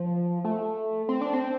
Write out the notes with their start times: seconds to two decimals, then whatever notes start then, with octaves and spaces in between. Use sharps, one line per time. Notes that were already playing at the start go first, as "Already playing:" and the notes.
Already playing: F3
0.44 A3
1.09 C4
1.21 D4
1.33 C4